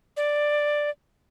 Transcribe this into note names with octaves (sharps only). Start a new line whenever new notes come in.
D5